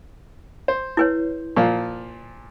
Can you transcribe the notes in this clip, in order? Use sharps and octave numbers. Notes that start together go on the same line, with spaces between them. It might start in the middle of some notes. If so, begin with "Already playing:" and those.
C5
E4 B4 C#5
A#2 F3